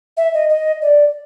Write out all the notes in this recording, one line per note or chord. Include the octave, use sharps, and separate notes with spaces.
E5
D#5
D#5
D5